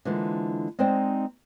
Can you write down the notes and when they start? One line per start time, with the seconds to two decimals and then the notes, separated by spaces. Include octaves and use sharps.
0.05 D3 E3 G#3 A#3 F4 C5
0.79 G#3 C4 D#4 C5 D5 G5